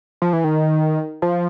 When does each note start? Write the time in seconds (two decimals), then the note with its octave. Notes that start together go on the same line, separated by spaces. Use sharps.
0.22 F3
0.33 E3
0.44 D#3
1.22 F3